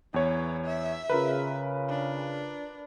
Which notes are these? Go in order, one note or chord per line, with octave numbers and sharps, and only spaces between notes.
E2 E3 C#5
E5
C#3 F4 A#4 B4
D4